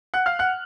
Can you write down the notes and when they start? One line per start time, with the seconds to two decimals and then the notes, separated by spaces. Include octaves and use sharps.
0.14 F#5 F#6
0.26 F5 F6
0.39 F#5 F#6